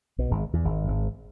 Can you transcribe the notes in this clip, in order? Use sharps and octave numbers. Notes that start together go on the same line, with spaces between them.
B1 B2
G#1 G#2
E2
G#1 G#2
G#1 G#2